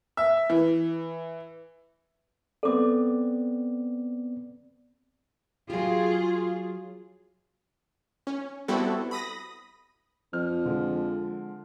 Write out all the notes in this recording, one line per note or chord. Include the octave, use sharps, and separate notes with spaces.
E5
E3
B3 C4 A4 D5 D6
F#3 F4 G4 G#4
C#4
G3 B3 C4 E4 F#4 A4
B5 D#6 A#6
F2 F6
D3 F3 G#3